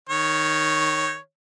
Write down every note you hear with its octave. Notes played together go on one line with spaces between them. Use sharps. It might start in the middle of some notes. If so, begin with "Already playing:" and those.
D#3 C#5